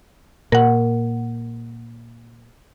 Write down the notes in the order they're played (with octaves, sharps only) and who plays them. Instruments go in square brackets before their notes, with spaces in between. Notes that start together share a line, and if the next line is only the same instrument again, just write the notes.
[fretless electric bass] A#2 [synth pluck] A#4 F#5